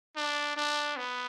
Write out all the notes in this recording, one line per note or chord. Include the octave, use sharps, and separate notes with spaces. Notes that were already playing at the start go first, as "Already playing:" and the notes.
D4
D4
B3